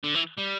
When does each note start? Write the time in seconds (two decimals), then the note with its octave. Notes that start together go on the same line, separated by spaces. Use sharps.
0.04 D3
0.14 E3
0.38 G3